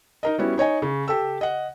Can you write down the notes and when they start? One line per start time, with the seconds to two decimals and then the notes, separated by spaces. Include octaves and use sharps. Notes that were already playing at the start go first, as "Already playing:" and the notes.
0.23 D#4 A#4 D#5
0.38 G3 B3 C#4 E4 F#4
0.58 D#4 C#5 D#5 G#5
0.82 C#3
1.08 G4 A4 E6
1.41 D#5 F#5